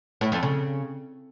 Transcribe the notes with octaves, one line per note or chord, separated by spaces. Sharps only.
A2
F2
C#3